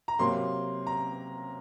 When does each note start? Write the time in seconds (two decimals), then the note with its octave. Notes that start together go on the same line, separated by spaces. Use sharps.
0.08 A#5
0.19 C3 F#3 A#3 C6
0.87 A#5